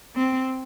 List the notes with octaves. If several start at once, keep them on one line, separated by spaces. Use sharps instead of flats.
C4